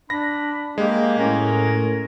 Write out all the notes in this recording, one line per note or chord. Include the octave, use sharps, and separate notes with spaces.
D4 B5 A#6
G#3 A#3 G4
A2 C#4 A#4